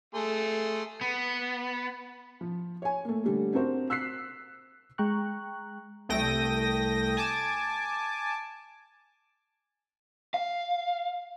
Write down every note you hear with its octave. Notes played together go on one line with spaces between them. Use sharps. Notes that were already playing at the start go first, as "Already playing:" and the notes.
A3 G#4 C6
B3
F3
C#5 G#5
A3 A#3
D3 G3 A3
C4 D4 F#4 A#4 C5
E6 F#6 B6 C7
G#3 G5 A#5 C#6 F#6
C2 A3 G5 D#6 A#6
G#5 A5 D6
F5